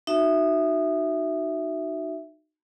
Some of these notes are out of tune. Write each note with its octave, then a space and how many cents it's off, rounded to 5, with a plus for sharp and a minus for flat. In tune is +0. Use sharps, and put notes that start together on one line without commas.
D#4 -20 F#4 +0 E5 +0